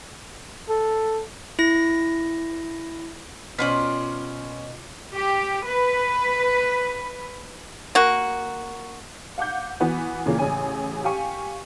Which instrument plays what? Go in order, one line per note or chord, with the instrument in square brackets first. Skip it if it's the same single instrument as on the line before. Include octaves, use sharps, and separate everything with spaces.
[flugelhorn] A4
[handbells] E4 A#6
[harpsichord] B2 [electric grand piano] C#4 B6 [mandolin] F4 C5 D5
[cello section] G4
B4
[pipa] A#3 F#4
[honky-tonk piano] F5 F#5 D6 G6
E3 B3 F#4
A#2 C#3 E3 A#3
A1 C#3 C#4 G#5
G4 F5 G#5 C#6